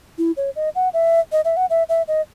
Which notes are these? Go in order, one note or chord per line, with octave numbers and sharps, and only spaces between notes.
E4
C#5
D#5
F#5
E5
D#5
E5
F#5
E5
E5
D#5